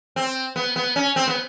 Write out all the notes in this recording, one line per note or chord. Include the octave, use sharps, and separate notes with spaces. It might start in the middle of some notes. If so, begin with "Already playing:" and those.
C4
B3
B3
C#4
C4
B3